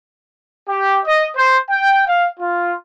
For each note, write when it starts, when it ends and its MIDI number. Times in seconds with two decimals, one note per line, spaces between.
0.68 0.99 67
1.05 1.26 75
1.36 1.57 72
1.69 2.03 79
2.07 2.27 77
2.39 2.73 65